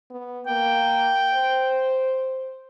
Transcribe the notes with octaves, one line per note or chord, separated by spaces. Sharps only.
B3
A#3 G5
C5